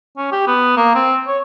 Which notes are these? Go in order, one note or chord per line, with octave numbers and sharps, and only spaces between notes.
C#4
G4
B3
A#3
C4
C#5